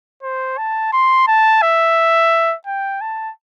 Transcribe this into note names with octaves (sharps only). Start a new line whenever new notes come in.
C5
A5
C6
A5
E5
G5
A5